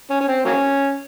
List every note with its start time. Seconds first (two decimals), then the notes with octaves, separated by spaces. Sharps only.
0.10 C#4
0.21 C#4
0.28 C4
0.45 F#3 A#3 C#4